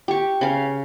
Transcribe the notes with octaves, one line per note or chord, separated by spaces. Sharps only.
G4 C#6
C#3 F5